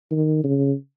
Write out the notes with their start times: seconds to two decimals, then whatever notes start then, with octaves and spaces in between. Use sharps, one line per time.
0.11 D#3
0.44 C#3